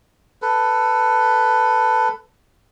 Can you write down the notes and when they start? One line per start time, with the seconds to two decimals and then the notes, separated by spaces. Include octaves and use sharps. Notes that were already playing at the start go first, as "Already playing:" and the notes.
0.42 A4 B4